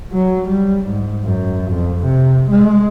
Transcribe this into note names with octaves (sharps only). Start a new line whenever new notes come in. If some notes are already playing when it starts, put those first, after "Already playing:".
F#3
G3
G#2
F#2
F2
C3
G#3